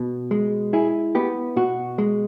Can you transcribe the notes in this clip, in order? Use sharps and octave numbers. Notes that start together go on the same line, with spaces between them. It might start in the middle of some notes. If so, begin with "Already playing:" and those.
Already playing: B2 B3
G#3
E4 G#4
B3 G4
B2 F#4
G#3